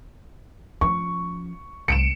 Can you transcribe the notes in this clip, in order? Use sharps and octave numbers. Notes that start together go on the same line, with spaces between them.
F3 C#4 C#6
C2 C#7 D7 E7